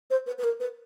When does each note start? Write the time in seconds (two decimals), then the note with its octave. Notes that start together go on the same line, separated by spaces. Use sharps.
0.10 C5
0.26 B4
0.38 B4
0.43 A#4
0.60 B4